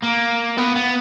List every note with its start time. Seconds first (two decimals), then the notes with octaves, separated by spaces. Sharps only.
0.03 A#3
0.58 B3
0.76 B3